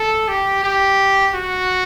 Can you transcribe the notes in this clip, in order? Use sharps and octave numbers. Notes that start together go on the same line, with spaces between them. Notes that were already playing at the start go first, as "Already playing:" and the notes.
Already playing: A4
G4
G4
F#4